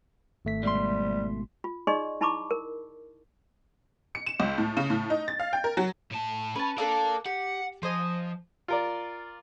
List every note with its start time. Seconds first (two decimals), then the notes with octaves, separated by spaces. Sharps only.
0.45 G#1 A3 B6
0.63 G#2 B2 G3 C6
1.64 F4
1.87 D#4 G#4 D5 D#5 C6 C#6
2.21 D#4 E4 A5 B5 C#6 D6
2.51 A#4
4.15 C#7
4.26 E7
4.40 C#2
4.58 A2
4.77 C#3
4.90 A2
5.10 D#4
5.28 A6
5.40 F5
5.53 G5
5.64 A#4
5.77 F#3
6.12 A2 A5
6.55 C#4 B4 A5
6.78 D4 A4 A#4 D5 F5
7.26 G4 F#5
7.83 F3 C5 D#5 G#5
8.68 F4 A#4 D5